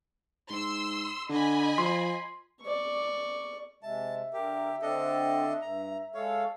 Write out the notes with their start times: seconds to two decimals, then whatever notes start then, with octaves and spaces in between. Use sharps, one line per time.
0.49 G#2 C6 E6
1.29 D3 D#5 G#5 B5
1.78 F3 C6
2.61 D5 C#6
3.83 C3 G#3 E5 A5
4.33 D3 G4 A#4
4.82 D3 C4 D4 A4 D#5
5.62 G2 A#5
6.15 G#3 A4 C#5 F5